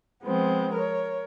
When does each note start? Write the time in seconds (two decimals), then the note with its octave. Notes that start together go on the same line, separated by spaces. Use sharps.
0.22 F3 G#3 B3 C4
0.73 A#4 C#5